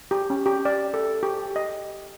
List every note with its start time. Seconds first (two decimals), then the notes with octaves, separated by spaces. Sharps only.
0.11 G4
0.30 C#4
0.46 G4
0.65 D5
0.94 A4
1.23 G4
1.56 D#5